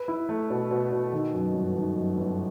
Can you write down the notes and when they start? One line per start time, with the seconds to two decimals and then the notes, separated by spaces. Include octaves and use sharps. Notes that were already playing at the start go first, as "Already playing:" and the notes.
Already playing: B4
0.08 E4
0.29 A3
0.50 B2
0.71 B2
0.92 B2
1.13 D#3
1.34 F#2
1.54 G1
1.76 D#3
1.97 F#2
2.17 G1